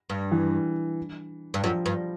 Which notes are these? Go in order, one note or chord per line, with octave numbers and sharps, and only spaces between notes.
G2
E3
G2
F#2 F3
G2